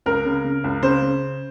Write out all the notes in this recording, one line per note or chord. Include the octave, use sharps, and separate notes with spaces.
C#2 A#4
C#3
C#3
C#2
C#3 C5
C#3